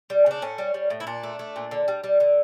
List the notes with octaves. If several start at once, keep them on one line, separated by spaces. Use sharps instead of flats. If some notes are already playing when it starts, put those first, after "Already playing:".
G3
C#3 D4
A2 C#4
G3
G3
A2
E4
A#2 D4
A3
A3
A#2
D3
G3
G3
D3